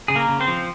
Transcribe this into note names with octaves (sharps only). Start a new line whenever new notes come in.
C#3 G#4
A#3 A#4
C#3
C4 C5
F3